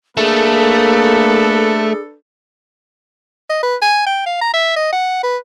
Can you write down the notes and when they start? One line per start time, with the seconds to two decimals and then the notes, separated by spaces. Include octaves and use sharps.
0.17 A3 A#3 D4 G#4 A4 B4
3.49 D#5
3.63 B4
3.82 G#5
4.06 G5
4.26 F5
4.41 A#5
4.53 E5
4.76 D#5
4.92 F#5
5.23 B4